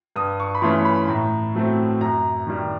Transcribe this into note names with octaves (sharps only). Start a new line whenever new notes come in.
G2 D#6
C#6
B5
E3 A3 C#4 C6
B5
A2 A#5
F#3 A3 C4
F#2 A#5
D#3 G3